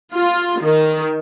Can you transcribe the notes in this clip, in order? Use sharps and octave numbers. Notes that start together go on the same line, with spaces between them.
F4
D#3